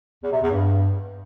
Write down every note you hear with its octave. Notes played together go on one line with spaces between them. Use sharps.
E2
C3
E2
G2